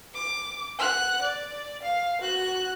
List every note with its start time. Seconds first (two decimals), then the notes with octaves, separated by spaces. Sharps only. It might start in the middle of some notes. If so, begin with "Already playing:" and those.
0.14 D6
0.79 F#5 F#6
1.22 D5
1.83 F5
2.21 F#4 F#6